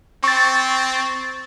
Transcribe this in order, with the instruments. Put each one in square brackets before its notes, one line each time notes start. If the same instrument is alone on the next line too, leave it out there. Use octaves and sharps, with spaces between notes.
[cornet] C4 [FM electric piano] C#6 A6